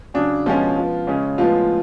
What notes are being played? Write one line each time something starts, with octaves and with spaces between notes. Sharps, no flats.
C#3 F#3 C#4 D4
B2 F3 G#3 C#4 F4
F3 B3
C#3 G#3 C#4
A2 F3 G#3 B3 F4